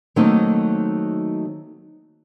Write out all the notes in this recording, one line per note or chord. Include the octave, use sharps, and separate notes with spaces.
D#3 F#3 A3 A#3 C4 D#4